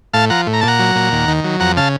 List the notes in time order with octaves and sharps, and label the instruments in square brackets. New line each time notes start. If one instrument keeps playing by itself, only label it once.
[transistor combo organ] A2 F5 A5
F3 F#5 A#5
A2
A#5
A#2 A5
F#5 A#5
F#3
A#2
D#2
D#3
F#3
F2 F#5 A#5
C#3 F5 A5